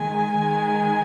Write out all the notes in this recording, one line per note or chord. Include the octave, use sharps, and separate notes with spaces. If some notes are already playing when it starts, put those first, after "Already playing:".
Already playing: D#3 G#3 G#5
D#3 G#3